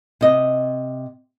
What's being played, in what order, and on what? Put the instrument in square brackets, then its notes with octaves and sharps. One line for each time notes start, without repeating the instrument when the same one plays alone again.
[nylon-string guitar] C3 D#5